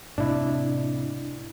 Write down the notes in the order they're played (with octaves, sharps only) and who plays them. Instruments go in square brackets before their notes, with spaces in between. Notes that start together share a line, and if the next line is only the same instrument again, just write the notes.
[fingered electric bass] A2 C3 [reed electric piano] D4 E4